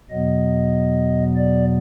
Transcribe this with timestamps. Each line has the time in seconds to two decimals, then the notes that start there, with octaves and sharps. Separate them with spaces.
0.10 E2 B2 F#3 B3 D#5
1.36 D5